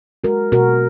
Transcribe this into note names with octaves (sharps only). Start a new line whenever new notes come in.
G#3 F#4 A#4
B2 F#4 A#4